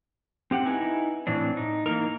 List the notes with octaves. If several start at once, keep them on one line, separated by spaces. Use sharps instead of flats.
C4 G4 F#5
D#4 E4 B4 G#5
A2 E3 C4 D4
D#4
E3 A#3 D#4 A#4